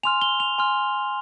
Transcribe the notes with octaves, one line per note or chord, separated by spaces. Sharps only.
G#5 C6 F6 F7
G7
F7
G#5 C6 F6